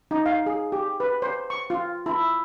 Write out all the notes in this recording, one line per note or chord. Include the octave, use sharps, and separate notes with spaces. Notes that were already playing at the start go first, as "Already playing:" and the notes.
D#4
F5
G#4
G4
B4
C5
C#6
F4
E4